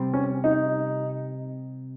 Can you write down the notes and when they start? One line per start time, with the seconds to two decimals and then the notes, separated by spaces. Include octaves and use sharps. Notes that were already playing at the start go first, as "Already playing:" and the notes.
Already playing: C3 G3 C4
0.14 C#4
0.44 D#4